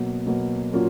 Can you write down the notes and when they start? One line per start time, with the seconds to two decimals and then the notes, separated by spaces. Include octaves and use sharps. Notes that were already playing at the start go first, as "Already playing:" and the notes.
Already playing: B2 F#3 A#3
0.27 B2 F#3 A#3
0.73 A#2 F#3 A#3 C#4 F4